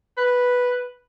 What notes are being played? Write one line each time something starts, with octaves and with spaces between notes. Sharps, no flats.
B4